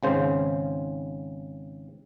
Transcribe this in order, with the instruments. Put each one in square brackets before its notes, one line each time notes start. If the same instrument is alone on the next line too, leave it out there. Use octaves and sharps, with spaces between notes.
[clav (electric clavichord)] G#1 C#3 C5